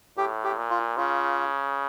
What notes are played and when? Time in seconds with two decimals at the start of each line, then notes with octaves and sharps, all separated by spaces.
0.18 A2 G4
0.44 G4
0.57 A#2
0.70 F4
0.97 C#3 F4